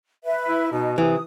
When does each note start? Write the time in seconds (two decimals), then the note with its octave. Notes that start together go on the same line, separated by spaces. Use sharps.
0.24 B4 E5
0.49 E4
0.72 B2 D#4 D#5
0.98 C3 E3 D#6